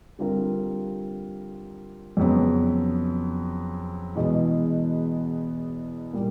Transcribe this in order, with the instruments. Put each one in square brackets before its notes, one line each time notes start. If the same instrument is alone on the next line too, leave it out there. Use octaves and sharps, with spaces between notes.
[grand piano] D3 G3 C4 F4 A#4
F2 C#3 F#3 B3
E2 B2 G#3 B3
A#2 G3 A#3